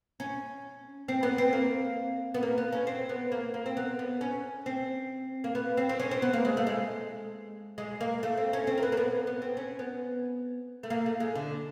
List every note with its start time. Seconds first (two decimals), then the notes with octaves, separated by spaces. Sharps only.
0.20 C#4
1.08 C4
1.23 B3
1.38 C4
1.53 A#3
2.34 B3
2.43 A#3
2.58 B3
2.72 C#4
2.87 C4
3.09 B3
3.32 A#3
3.54 A#3
3.66 C4
3.77 B3
3.99 B3
4.21 C#4
4.66 C4
5.44 A#3
5.55 B3
5.77 C4
5.89 C4
6.00 C#4
6.11 C4
6.22 B3
6.33 A#3
6.45 G#3
6.57 A3
6.67 G#3
7.78 G#3
8.01 A#3
8.23 A3
8.37 C4
8.53 C#4
8.67 C4
8.78 A#3
8.83 B3
8.92 A#3
8.97 B3
9.27 B3
9.42 C4
9.57 C#4
9.79 B3
10.83 A3
10.90 A#3
11.06 A3
11.20 G#3
11.35 D3